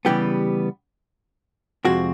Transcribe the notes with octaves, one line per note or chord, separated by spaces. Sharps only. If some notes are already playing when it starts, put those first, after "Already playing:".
C#3 E3 G3 B3 G4
F2 C3 F3 G#3 C4 F#4